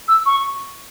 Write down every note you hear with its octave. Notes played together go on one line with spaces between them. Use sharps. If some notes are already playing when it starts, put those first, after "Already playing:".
E6
C#6